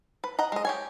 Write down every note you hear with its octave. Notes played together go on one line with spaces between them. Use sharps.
B4
D#5 F#5 A#5
G#3 D#5
G4 C#5 G#5